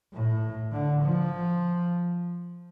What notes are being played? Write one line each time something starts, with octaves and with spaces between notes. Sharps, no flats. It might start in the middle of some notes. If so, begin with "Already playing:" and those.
A2
D3
F3